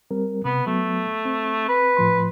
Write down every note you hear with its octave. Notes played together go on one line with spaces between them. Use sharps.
G3 C4 A#4
C3 B3
F#3 A3 B3
C4
B4
A2 F3 C6